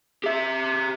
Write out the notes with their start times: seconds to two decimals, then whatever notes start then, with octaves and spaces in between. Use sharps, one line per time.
0.24 G4 E5